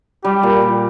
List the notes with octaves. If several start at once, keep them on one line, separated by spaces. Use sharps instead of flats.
G3 G4
A#2
A#2